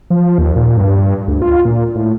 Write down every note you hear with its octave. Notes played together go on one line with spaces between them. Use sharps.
F3
D#2
A#2
G2
D2
F4
A#2
A2